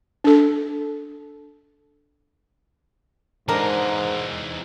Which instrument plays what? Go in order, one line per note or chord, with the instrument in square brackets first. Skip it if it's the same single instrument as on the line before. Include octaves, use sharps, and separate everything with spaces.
[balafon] D4 A4
[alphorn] G#2 [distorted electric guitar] E3 G#3 [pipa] D4 A#4 [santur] D#4 C5